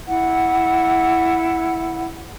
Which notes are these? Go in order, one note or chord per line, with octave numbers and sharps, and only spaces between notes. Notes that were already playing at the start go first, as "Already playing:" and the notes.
E4 F#5